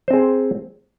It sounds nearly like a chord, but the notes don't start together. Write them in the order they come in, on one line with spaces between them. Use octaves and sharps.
C5 C4 G#4